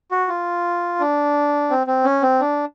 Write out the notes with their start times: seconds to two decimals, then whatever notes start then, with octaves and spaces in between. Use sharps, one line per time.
0.11 F#4
0.28 F4
1.00 D4
1.70 C4
1.87 C4
2.04 C#4
2.22 C4
2.41 D4